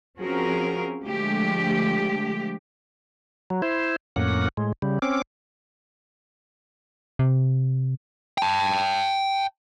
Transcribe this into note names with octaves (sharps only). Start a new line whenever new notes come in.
F3 C4 C#4 F#4 G#4 A#4
D3 F3 G#3 A3 G4
F#3
E4 C5
F2 A2 A#3 C#4 F#5
A2 G#3
C#3 G3
C4 C#4 D6
C3
G5 A5